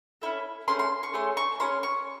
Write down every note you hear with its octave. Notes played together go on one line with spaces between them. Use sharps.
C#4 E4 A4
A3 C#4 G#4 C6
C6
C#6
A3 C#4 G#4 C6
C#6
C#4 E4 G#4 C6
C#6